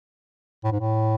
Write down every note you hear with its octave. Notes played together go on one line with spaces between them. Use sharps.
A2
G#2
A2